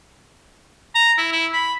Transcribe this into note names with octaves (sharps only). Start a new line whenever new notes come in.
A#5
E4
E4
B5